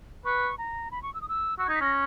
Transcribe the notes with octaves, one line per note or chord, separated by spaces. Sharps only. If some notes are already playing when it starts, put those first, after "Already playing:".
B4 C#6
A#5
B5
C#6
E6
D#6
E6
F#4 E6
G#6
D#4
B6
C#4 A#6